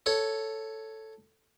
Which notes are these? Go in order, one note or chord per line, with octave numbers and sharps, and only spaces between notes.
A4 C#5